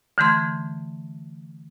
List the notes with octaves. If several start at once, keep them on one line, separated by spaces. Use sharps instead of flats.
D3 E3 A3 C6 G#6